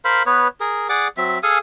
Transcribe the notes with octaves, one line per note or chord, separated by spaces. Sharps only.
A#4 C5 F5 B5
B3 B4 C#5
G#4 A#4
G#4 D5 F#5 D6
F#3 C4 E5
G#4 A4 F5 G#5